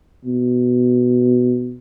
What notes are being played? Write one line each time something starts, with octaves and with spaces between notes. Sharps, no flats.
B2